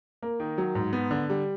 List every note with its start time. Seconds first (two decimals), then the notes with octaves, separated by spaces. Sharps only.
0.23 A#3
0.40 D#3
0.58 F#3
0.75 G#2
0.93 B3
1.11 D3
1.30 G3